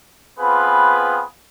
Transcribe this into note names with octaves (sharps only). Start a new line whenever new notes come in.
B3 C4 F4 G#4 B4